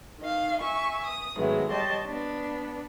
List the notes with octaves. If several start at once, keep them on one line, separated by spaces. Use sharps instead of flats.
D#3 D#5 F5
E5 G#5 C#6
D#6
G#2 D#3 F#3 G#3 A3 B3
G3 C#5 D#5 G5 A5 C6
B3 D4